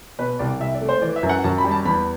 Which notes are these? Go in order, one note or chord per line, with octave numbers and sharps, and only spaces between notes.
B2 B4
C2 D5
C2 E5
D5
A3
C5
E3 D5
E5
F#2
F#5
F#2 A5
B5
G3
A5
E2 B5